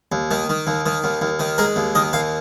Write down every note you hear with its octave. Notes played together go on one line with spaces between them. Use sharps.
D#2
D#3
D#3
D#2
D#3
D#2
D#2
D#3
G#3 A#4
D#2
D#3 D#5
D#2 F5